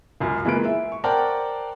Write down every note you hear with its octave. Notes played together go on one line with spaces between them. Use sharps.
C#2 F#2
E3 G#3 A#3 F4 B4 D7
E5
C#6
A#4 C5 D5 F#5 G5 A5